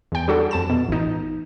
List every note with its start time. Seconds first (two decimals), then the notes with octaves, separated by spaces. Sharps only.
0.12 E2 G5
0.28 G3 D4 F#4 G#4 A4
0.51 F2 A5 E7
0.70 B2
0.89 A1 D#4